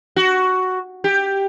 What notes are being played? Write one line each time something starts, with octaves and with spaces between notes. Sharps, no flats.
F#4
G4